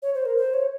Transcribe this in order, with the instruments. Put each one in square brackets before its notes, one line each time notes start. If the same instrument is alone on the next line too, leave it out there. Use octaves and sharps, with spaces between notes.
[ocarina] C#5
C5
A#4
C5
C#5